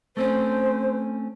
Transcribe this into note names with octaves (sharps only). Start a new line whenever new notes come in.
A3 C4 C#4 C5